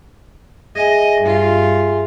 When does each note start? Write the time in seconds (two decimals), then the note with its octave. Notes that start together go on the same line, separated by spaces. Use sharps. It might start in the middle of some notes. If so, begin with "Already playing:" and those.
0.75 G#4 D#5 E5 G#5
1.22 G2 F4